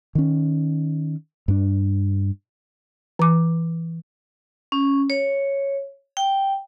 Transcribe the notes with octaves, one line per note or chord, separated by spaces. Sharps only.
D#3 C#4
G2 D4
E3 D6
C#4
C#5
G5